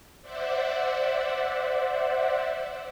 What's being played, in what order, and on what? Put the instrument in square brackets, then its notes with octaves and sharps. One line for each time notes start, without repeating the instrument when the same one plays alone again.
[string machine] C5 D5 E5 F#5